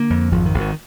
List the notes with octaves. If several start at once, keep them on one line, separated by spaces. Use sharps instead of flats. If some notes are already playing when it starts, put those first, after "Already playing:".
Already playing: D3 A#3
F2
G#1 F3
D#3
G#1
D#3